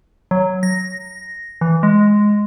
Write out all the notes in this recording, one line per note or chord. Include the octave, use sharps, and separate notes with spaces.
F#3
A#6
E3
G#3